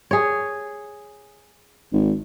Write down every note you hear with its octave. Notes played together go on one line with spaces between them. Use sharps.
G#4 C#5
G#1